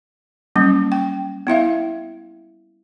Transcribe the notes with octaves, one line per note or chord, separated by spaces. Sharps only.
F#3 G3 A#3 C#4
G5
B3 E4 E5 F5